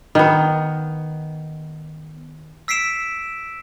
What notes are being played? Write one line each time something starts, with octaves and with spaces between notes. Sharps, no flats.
D#3 B3
E6 B6 C7 D7 E7